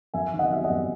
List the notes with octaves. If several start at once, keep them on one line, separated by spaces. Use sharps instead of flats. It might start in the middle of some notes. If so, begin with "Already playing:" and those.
F#2 E5 G#5
D#3
D#5 F#5
F#3 E5
D#5 F#5
F#2